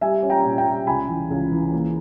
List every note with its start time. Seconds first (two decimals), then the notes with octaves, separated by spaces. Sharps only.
0.01 G3 E5 G#5
0.22 C#4
0.30 G5 A#5
0.45 A#2
0.58 G5 A#5
0.66 G3
0.87 C#2 G#5 B5
1.08 E3
1.30 C#2
1.51 E3
1.73 A#3